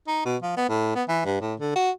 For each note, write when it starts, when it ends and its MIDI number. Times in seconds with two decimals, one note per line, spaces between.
0.07 0.25 63
0.25 0.37 47
0.42 0.54 53
0.57 0.68 59
0.69 0.95 45
0.95 1.04 59
1.08 1.22 52
1.25 1.40 43
1.41 1.55 45
1.60 1.73 50
1.76 1.91 66